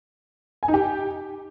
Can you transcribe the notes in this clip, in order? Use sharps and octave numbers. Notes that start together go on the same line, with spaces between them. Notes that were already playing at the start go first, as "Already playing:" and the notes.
G#5
D#4
G4